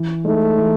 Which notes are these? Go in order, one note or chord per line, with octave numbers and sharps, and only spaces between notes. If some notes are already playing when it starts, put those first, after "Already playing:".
Already playing: E3
G#3 A3 D#4
E3